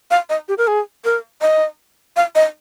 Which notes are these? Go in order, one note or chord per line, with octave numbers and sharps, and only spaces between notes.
F5
D#5
G4
A#4
G#4
A#4
D#5
F5
D#5